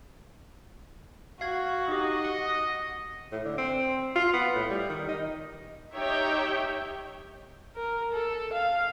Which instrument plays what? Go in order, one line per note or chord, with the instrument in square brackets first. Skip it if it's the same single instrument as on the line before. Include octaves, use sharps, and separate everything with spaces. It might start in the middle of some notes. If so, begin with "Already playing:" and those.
[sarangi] F#4 [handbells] F5 G#6
[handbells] D#4 G4 [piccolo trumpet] D#5
[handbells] F#5
[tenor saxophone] A2
D3
C4
F4
B3
A2
G3
D#3
D#4
[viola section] D#4 G4 C#5 E5 G5
[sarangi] A#4
A4
F5